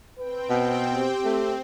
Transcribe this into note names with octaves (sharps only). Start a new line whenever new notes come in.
C4 B4 G5
B2
G4
A3 C4